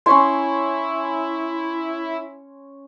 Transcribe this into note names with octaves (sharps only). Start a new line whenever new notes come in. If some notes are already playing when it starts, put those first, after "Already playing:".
C#4 E4 C#5 C6